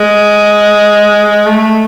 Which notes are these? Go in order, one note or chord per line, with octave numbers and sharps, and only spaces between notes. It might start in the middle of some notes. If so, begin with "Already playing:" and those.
Already playing: G#3
A3